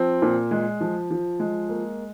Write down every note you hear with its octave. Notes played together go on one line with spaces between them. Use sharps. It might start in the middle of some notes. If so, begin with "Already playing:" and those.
Already playing: F3 C4
A#2
G#3
F3
F3
G#3
A#3